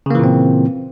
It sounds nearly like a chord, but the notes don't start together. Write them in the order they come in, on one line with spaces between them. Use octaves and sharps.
C#3 A#3 E3 A#2 C4